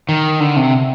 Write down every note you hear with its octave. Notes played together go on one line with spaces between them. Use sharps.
D#3
D3
C3